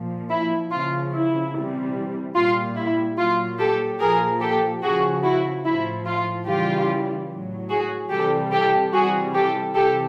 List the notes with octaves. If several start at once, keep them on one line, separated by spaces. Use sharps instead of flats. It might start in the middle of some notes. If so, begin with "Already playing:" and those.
Already playing: A#2 F3
E4
C#3 F3 F4
E4
C3 E3 G3
A#2 G3 F4
E4
A#2 F#3 F4
G4 A4
A#2 F3 G#4 A#4
G4 A4
C#3 F3 F#4 G#4
E4 F#4
A2 F3 E4
F4
C#3 E3 G3 F4 G4
A2 F#3
F#4 G#4
C3 E3 G3 G4 A4
G4 A4
C3 E3 G3 F#4 G#4
G4 A4
C3 E3 G4 A4